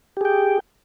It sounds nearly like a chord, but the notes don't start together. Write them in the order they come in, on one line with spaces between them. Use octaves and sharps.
G4 G#4 G5